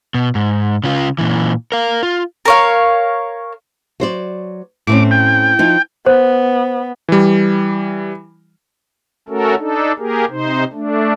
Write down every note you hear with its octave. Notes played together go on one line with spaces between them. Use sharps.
B2
G#2
C#3 F4
A#2 E3
A#4 F5
F4
A#4 C#5 F5
F#3 C5 D5
A2 C4 C#4 D6
G5
F3 D#4
B3 C5
E3 G3
A3 C#4 F#4 A4 A#4
D4 D#4 A4
A#3 G4 G#4 A#4
C3 D#4 C5
A3 D4